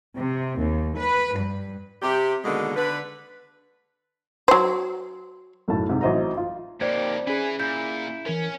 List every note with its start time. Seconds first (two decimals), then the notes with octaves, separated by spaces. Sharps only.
0.16 C3
0.59 D#2
0.97 B4
1.35 G2
2.02 C3 G4
2.45 B2 D3 D#3 G#3 A#3
2.75 D3 B4
4.48 F#3 C5
5.68 B1 F#2 A2 A5
5.89 G#2 C3
6.01 A1 F#3 C5 D#5 E5 A#5
6.37 F4
6.81 F2 A#2 A#3 D#4 G4 C5 D5 G#6
7.27 C#4 E4 G#4 B4 G#5
7.60 A#2 E4 G6
8.26 E3 C#4 A#4